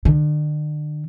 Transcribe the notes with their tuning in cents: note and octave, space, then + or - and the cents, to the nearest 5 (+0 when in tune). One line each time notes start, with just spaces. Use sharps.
D3 +40